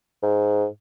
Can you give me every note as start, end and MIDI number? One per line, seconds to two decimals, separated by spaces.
0.22 0.66 44